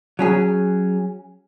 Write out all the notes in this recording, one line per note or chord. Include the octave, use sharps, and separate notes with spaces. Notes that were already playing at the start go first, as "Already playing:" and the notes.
F#3 C#4 G#4